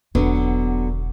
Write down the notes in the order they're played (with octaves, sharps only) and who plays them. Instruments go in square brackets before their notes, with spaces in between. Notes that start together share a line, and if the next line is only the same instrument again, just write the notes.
[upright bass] E1 [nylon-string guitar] D3 F#3 B3